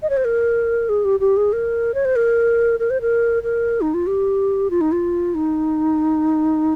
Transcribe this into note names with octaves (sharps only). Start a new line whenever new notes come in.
D#5
C#5
C5
A#4
G#4
G4
G4
G#4
A#4
C#5
C5
A#4
A#4
C5
A#4
A#4
D#4
F4
G4
F4
D#4
F4
D#4